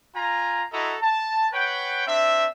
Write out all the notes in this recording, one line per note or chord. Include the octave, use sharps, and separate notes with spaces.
F4 G#5 A#5
E4 F#4 A4 D#5 A#5
A5
B4 C#5 F#5 G5
C4 D4 E5